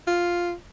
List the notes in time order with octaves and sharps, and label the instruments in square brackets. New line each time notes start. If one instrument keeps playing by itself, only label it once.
[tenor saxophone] F4